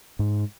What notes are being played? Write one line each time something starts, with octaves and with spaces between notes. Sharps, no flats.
G#2